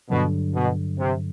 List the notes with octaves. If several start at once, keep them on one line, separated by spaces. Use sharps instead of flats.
G2 B2 D3 F#3
B2
C3